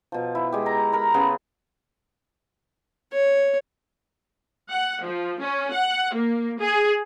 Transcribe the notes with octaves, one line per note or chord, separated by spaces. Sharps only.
B2 F3
E4
G#3 G4
A#5
A#4 A#5 B5
C#3 B3 G#4 C6
C#5
F#5
F3
C#4
F#5
A#3
G#4